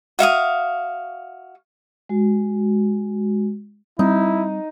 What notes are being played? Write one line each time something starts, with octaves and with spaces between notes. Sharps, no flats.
F#4 E5 F5 D#6
G#3 F#4
G3 C4 D#4 E4